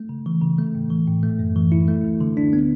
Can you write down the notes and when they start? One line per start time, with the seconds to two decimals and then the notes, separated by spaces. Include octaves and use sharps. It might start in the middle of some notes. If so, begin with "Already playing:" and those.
Already playing: A3
0.09 C#3
0.26 E3
0.42 C#3
0.58 A3
0.75 A2
0.91 E3
1.08 A2
1.23 A3
1.39 F#2
1.56 E3
1.72 E4
1.88 A3
2.04 D2
2.21 D3
2.37 D4
2.53 B3